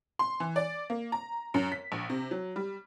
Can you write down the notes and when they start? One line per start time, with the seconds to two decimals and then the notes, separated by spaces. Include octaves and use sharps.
0.19 C6
0.40 E3
0.56 D5
0.90 A#3
1.12 A#5
1.54 F#2
1.72 B6
1.92 A#1
2.10 C3
2.31 F#3
2.56 G3